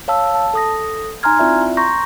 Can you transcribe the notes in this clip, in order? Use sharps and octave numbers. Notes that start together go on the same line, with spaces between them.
C#5 F5 A5 E6
A5
A4 D#6 A#6
D#4 G#5 A#5 C6 F6 G#6
C4 E4 F4 D5 E5
A#5 C6 C#6 G6 A#6